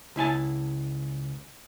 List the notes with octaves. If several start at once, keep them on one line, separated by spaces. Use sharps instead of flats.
C#2 E4 G#5 A5